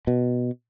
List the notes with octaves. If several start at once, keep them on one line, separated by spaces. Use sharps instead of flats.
B2